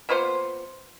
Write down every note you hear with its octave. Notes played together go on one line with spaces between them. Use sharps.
A#3 B3 F4 C5